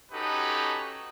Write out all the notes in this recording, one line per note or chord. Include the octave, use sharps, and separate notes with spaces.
C#4 D#4 F#4 G4 A4 B4